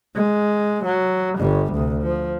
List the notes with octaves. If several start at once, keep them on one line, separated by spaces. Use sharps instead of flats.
G#3
F#3
G1 G3
D2 C3
F3